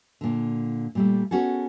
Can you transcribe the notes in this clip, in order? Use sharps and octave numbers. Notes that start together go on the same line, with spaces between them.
A#2 D3
A#2 G3 A3
B3 C#4 F#4 G#4 A4